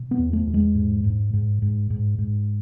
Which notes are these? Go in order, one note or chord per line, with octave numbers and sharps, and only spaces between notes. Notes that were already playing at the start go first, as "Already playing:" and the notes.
Already playing: B2
B3
E2
A3
E2
G#3
G#2
G#2
G#2
G#2
G#2
G#2